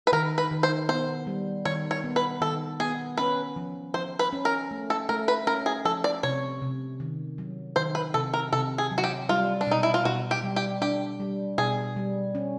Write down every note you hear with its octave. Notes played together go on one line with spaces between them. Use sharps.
B4
D#3 A#4
B4
D#3
C5
B3 C5
G3
D#3 C#5
C#5
B3
B4
D#3 A4
B3 G#4
C#4 B4
F3
F3 C5
B4
C#4
A#4
A3
A4
A3 A#4
B4
C#4 A#4
G#4
F3 A4
D5
C3 C#5
C3
D#3
F#3
D#3 C5
B4
C3 A4
A#4
C3 A4
G#4
F#3
F#4
G4
G3 F4
D4
B2 D#4
E4
F4
B2 F#4
G4
G3
G4
D4 G4
G3
B2 G#4
G3
C#4